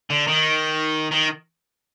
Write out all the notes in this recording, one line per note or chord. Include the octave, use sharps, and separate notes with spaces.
D3
D#3
D#3